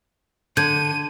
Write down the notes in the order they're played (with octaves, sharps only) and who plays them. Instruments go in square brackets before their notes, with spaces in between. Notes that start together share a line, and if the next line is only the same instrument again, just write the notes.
[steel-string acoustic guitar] D3 [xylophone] G6 G#6 [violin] D#7